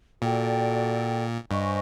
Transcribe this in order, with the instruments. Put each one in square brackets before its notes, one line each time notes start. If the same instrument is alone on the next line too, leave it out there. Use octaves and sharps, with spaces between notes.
[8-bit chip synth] A#2 [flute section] F#4 A4 D5 G5
[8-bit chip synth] G2 [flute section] C5 D#5 G#5 C#6